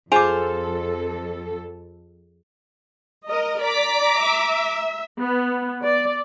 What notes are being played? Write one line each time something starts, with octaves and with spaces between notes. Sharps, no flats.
F2 F4 G#4 A4 C5 G#5 D6 F7
A#4 D#5
D5 A#5 D6 B6
E5
B3
D5